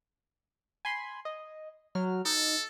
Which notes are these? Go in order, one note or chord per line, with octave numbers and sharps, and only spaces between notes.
G#5 B5 C6
D#5
F#3 F6
D#4 A4